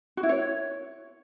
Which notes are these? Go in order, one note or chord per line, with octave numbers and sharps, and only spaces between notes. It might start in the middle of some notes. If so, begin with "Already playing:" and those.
F#4
E4
C#5